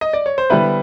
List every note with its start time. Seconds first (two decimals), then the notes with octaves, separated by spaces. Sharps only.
0.01 D#5
0.13 D5
0.26 C#5
0.38 C5
0.50 D3 G3 B3 E4 B4